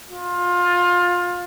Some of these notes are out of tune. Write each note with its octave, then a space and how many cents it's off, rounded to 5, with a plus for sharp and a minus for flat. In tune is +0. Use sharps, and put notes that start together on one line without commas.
F4 +20